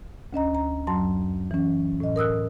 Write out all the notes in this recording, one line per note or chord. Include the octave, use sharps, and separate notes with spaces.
D2 C#4 D#5 A#5
A#5
F#2 F#3 A5 A#5 C6
E3 C#4
A2 D#5
A#4 D#6 E6 F#6